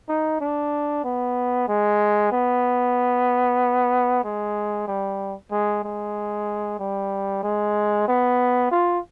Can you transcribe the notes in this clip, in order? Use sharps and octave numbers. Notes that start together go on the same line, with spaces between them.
D#4
D4
B3
G#3
B3
G#3
G3
G#3
G#3
G3
G#3
B3
F4